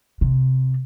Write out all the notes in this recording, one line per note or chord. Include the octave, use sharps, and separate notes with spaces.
C3